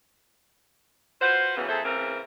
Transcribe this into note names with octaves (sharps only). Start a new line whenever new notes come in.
F4 F#4 B4 C5
A2 C#3 E3 F#3 B3
F2 A#2 G#4 A4 C5 E5
A2 C#3 E3 B3 C4 A#4